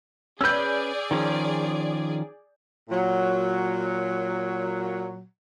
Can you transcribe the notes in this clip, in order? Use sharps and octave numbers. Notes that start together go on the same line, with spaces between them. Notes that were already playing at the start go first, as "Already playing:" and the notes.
C#4 G#4 B4 D5 E6 G6
D#3 F3 C#4
A#2 F#3